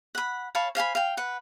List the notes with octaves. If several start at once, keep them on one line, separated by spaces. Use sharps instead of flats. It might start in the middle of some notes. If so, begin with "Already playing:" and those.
F#5 B5
C#5 F5 A5 B5
C5 F5 G#5 B5
F5 G5
B4 F#5